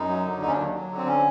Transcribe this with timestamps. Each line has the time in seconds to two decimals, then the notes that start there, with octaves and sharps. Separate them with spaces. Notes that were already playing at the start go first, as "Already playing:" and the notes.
Already playing: F#2 D#4
0.09 F#3
0.25 D3
0.42 D#2 D#4
0.48 C#4
0.52 D4
0.58 F#3
0.74 F#3
0.91 D3
0.97 C4
1.07 C#4